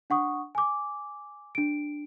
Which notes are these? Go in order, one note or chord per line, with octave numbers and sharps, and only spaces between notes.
D4 F#5 C#6 D#6
G#5 D6
D4 D7